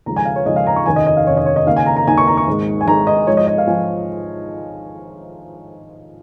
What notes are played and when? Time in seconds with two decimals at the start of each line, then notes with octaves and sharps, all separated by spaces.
0.06 D#2 C#3 F3 G#3 A#5
0.16 G#5
0.25 F5
0.36 C#5
0.45 D#2 C#3 F3 G#3 D#5
0.56 F5
0.67 A#5
0.76 C#6
0.86 F1 D#2 D#3 C#4 G#5
0.96 D#5
1.06 D#5
1.17 F5
1.27 F1 D#2 D#3 C#4 C#5
1.37 D#5
1.46 C#5
1.56 D#5
1.66 D#2 C#3 A#3 D#4 F5
1.76 G#5
1.86 A#5
1.96 A#5
2.07 D#2 C#3 A#3 D#4 G#5
2.18 C#6
2.27 A#5
2.37 C#6
2.47 G#1 G#2 G#3
2.81 G#5
2.87 G#1 G#2 G#3 A#5
3.07 D#5
3.27 G#2 F3 G#3 D#4 C#5
3.37 D#5
3.47 D#5
3.58 F5
3.67 F3 G#5